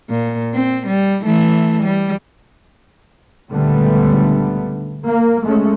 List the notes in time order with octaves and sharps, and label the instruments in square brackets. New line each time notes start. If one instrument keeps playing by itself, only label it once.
[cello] A#2
C4
G3
E3 A3
G3
[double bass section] C#2 A#2 D3 G3 A3 B3
A#3
G#3 A3 C#4